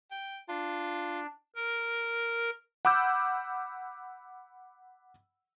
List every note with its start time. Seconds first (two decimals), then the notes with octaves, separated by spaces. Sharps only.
0.11 G5
0.48 D4 F4
1.56 A#4
2.85 F#5 B5 D6 E6 G6